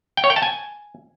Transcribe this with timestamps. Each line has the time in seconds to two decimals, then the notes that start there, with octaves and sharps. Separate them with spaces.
0.17 G5
0.24 C#5
0.30 G5
0.36 A5
0.43 G#5